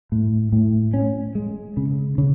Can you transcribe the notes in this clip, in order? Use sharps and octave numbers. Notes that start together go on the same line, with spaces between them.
A2
A2
C#4
G#3
C#3
C#3